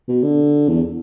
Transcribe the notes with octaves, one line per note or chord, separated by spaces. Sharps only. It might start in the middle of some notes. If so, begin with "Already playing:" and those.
B2
D3
E2